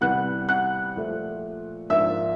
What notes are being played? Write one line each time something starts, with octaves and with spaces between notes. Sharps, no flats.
C3 E3 G3 B3 F#5 F#6
F#5 F#6
A#2 F3 A3
G#2 F3 A#3 D4 E5 E6